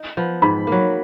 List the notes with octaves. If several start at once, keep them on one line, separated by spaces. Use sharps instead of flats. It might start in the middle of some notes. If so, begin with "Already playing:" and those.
Already playing: D#4
F3 B3
G#2 B5
F#3 A#3